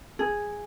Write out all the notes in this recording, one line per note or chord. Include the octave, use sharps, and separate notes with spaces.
G#4